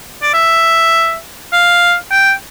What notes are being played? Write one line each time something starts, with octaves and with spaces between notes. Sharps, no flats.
D5
E5
F5
G5